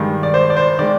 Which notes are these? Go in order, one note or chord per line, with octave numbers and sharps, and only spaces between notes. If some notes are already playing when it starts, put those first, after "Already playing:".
Already playing: G2 D#3 G#3
D5
C5
D5
C5
D#3 G#3 D5